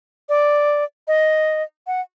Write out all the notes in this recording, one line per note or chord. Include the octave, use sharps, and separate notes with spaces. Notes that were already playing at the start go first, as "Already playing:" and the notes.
D5
D#5
F#5